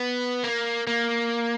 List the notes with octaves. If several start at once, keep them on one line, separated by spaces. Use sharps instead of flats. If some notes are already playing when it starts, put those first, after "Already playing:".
Already playing: B3
A#3
A#3